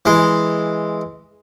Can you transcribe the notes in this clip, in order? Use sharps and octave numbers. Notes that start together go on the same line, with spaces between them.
E3 G#3